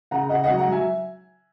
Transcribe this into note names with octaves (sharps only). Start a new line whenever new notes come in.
C#3 F#5 A#5
C#3 D#5 F#5
D#5 F#5
F#3
F#5 A#5
F#3 E5 G#5